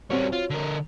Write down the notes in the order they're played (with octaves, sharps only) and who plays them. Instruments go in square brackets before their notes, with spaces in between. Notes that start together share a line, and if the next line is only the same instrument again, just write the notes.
[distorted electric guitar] G3 C#4 [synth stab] C4 F#4 C#5
[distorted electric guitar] F4
D3 A#4